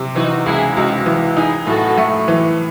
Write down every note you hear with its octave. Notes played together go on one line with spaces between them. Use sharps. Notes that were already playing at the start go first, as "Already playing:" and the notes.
Already playing: C3 C4
E3 D#4 F#4
C#2 E4 G#4
C#2 D#4 F#4
E3
D#4 E4 G#4
A2 F#4 A4
A3
E3